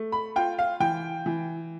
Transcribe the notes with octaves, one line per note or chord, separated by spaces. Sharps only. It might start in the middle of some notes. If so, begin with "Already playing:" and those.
Already playing: A3
B5
F4 G5
F5
E3 G5
E3